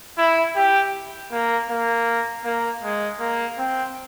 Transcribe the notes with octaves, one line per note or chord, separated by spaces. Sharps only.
E4
G4
A#3
A#3
A#3
G#3
A#3
C4